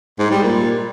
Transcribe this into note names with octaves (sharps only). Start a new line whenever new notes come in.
G#2
G3
A#2